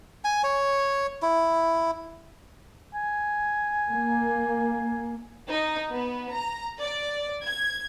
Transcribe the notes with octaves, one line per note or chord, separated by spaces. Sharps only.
G#5
C#5
E4
G#5
A#3
D#4
B3
A#5
D5
G#6